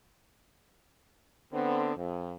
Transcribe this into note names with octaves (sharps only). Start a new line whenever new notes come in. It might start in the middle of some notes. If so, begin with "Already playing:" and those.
D3 B3 C4
F2